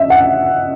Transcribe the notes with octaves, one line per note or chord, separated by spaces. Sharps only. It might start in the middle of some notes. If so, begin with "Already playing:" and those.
Already playing: D#5 E5
F#5